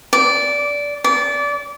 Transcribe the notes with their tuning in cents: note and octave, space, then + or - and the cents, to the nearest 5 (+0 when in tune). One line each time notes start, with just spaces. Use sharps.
D5 -15
D5 -25